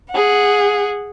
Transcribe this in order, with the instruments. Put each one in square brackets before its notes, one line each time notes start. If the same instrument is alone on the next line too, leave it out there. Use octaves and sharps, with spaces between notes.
[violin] G#4 F#5